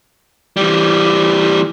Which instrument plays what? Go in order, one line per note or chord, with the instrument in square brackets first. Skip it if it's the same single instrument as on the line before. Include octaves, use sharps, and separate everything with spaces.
[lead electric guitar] E3 G3